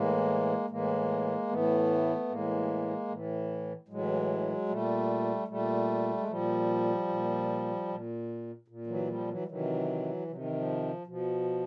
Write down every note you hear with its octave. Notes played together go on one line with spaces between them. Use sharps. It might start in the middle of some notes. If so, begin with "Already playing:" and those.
Already playing: A2 E3 G#3 A#3
A2 E3 G#3 A#3
A2 E3 A3 B3
A2 E3 G#3 A#3
A2 E3
A2 E3 F#3 G#3
A#2 G3 A3
A#2 G3 A3
G#3
A#2 F3 G3
A#2
A#2
A#2
E3 F#3
F3 G3
E3 F#3
G3
C3 D#3 E3 F#3
C3 D#3 F3 F#3
E3
F3
B2 F3